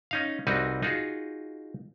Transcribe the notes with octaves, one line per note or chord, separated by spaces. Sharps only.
C#4 D#4 F5
C2 G3 C4 D#4 F#4 B4
D#4 F4 F#4 G#4